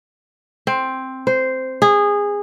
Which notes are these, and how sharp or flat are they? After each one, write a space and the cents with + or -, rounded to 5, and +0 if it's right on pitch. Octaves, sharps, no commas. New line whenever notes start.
C4 +5
C5 -10
G#4 -20